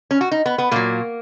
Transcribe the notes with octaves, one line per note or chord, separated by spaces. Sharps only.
C#4
F#4
D#4
B3
B3
A#2 F#3 A#3